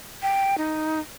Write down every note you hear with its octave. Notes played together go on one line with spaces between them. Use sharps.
G5
D#4